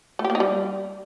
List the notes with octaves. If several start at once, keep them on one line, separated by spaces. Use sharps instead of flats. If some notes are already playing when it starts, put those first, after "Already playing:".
A3
G4
A#3
D#4
G3